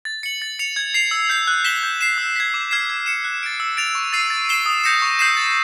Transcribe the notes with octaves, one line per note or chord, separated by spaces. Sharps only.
A6
C#7 F#7
A6
C#7 F7
G#6
C7 F7
E6
G6 C7
F#6
B6 E7 G7
G6
C7 E7
E6
G#6 B6
D6
F6 G#6 C7 E7
G#6
C#7 E7
F#6
A6 D7
E6
A6 D7 F7
C#6
E6 A6 C7 D#7
A6
C7 E7 G7
D#6
G6 A#6 C#7 E7
C#6
E6 G6 C7 E7
A6